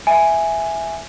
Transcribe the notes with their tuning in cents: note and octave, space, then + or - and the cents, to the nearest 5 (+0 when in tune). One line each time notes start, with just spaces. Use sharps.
E5 +0 G#5 +0